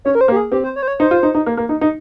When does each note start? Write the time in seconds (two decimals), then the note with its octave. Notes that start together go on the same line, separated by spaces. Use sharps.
0.05 C#4 C#5
0.15 A#4
0.21 C5
0.28 A#3
0.32 G4
0.36 G#4
0.52 C4 G4
0.64 C5
0.76 C#5
0.83 C5
0.88 C#5
0.99 D#4 C5
1.11 F4
1.23 D#4
1.35 D#4
1.46 A#3
1.57 A#3
1.69 D#4
1.81 D#4